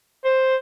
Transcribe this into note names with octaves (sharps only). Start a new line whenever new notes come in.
C5